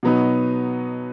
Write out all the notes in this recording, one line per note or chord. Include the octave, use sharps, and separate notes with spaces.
B2 F#3 B3 D#4